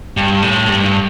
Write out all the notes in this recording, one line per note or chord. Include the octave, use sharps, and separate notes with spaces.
G2
A2
G2